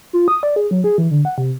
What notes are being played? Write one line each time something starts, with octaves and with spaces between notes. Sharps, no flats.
F4
D#6
D5
G#4
F#3
G#4
E3
D3
F#5
C3